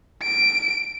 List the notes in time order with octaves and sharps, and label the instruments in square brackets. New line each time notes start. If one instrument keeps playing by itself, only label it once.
[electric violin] D7